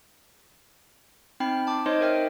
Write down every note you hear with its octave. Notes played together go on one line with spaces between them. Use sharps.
C4 D#4 G5 B5 C7
A5 D6
D#4 C5 C#5 D#5 C6
A#4 E5 G5